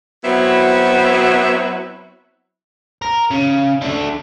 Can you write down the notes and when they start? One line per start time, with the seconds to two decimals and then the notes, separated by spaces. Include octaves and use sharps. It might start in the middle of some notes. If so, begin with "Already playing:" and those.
0.24 F#3 B3 C4 E4 F#4 E5
3.02 A#4
3.31 C#3
3.81 D3 A3